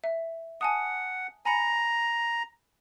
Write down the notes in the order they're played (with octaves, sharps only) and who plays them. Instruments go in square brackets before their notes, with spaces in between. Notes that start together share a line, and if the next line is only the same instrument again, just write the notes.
[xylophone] E5
[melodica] F#5 [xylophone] G#5 A5 D#6
[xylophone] G#5 B5 C#7 [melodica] A#5